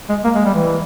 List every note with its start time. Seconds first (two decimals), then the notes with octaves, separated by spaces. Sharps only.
0.09 G#3
0.24 A#3
0.35 G#3
0.45 G3
0.55 E3